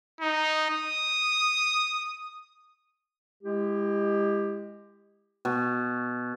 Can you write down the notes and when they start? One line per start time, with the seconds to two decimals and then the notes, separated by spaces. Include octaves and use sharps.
0.21 D#4
0.71 D#6
3.43 G#3 E4 G4
5.45 B2